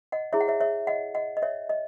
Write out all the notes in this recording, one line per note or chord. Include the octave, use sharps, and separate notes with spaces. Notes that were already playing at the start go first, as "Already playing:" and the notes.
D#5 F#5
E4 G#4 C#5 E5
F#5
C#5 E5
C#5 E5
D#5 F#5
D#5 F#5
D#5
C#5 E5
D#5